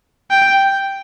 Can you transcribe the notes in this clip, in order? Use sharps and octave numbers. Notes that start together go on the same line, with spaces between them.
G5